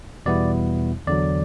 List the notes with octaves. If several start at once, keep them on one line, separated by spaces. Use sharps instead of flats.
E2 B2 G3 B3 E4 D5
E2 D3 F#3 D5